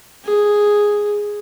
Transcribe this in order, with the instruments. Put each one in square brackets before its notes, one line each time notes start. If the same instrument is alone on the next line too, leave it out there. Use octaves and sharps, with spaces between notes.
[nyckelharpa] G#4